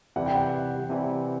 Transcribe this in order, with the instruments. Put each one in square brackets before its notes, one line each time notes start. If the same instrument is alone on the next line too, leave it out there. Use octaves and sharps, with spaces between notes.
[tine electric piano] C3 E3 G3 [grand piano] F#5
[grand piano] G5
F#5
[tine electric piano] C3 E3 G3